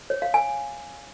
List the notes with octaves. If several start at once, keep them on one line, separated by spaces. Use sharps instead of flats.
C#5
F5
G#5